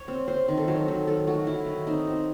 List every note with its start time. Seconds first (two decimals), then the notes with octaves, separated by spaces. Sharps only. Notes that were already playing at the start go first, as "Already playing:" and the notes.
Already playing: C#5
0.08 C4
0.28 C4 C5
0.48 D#3
0.57 A4
0.68 F#3 C5
0.88 D#3 A4
1.07 D#3 A4
1.27 A3 F#4
1.47 F#3 E4
1.67 D#3
1.87 C4 D#4
2.07 C4